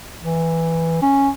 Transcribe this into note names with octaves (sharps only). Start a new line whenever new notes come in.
E3
C#4